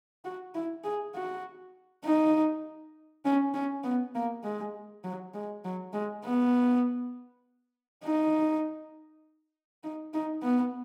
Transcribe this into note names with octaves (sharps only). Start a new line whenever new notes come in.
F#4
E4
G#4
F#4
D#4
C#4
C#4
B3
A#3
G#3
F#3
G#3
F#3
G#3
B3
D#4
D#4
D#4
B3